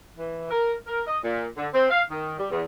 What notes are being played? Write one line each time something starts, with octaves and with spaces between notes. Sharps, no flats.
E3
A#4
A#4
D#5
A#2
D3
C4
F5
D#3
G3
E2